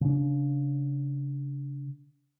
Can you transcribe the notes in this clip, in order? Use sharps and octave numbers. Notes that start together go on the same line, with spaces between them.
C#3 D4